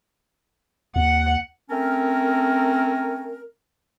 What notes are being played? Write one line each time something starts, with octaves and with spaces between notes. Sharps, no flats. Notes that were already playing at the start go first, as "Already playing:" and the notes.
D#2 F#5
A3 C4 C#4 A#4